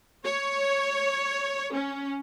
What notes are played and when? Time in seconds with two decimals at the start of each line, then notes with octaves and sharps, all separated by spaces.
0.24 C#5
1.74 C#4